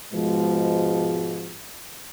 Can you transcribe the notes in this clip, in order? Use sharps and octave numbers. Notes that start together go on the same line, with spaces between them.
G#2 B2 F3 G#3